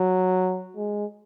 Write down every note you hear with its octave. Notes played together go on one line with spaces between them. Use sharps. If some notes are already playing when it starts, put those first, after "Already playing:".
Already playing: F#3
G#3